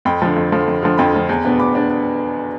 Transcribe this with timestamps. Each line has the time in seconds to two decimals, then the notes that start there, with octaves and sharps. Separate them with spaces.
0.05 F2 G5 B5
0.22 D3 F3
0.36 F2
0.52 D3 F3
0.68 F2
0.83 D3 F3
0.97 F2 G5 B5
1.14 D3 F3
1.29 E2
1.45 B2 B3 D4
1.59 E2 B5 D6
1.75 B3 D4